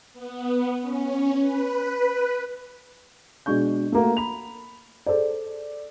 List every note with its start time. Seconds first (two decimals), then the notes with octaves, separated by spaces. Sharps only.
0.13 B3
0.81 C#4
1.40 B4
3.46 B2 G#3 D4 C#6 G6
3.92 A3 A#3 F#4
4.17 B5 F7
5.06 G#4 A4 C5 D5